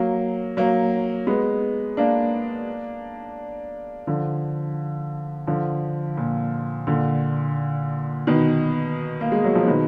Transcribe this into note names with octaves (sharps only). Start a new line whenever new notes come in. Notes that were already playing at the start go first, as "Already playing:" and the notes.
Already playing: F#3 A#3
F#3 A#3
G#3 B3
A#3 D4
D3 F3
D3 F3
A#2
A#2 D3
B2 D#3
A#3
G#3
F#3
F3
B2 D#3